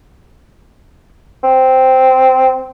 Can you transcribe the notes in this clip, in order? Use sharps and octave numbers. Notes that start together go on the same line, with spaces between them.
C4